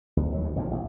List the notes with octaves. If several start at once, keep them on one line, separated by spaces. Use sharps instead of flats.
D2
D#2 F#3
D2
A#1 D#2 A2 F3
A1